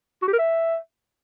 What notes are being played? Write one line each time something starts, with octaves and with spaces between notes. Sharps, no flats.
F#4
G4
A#4
E5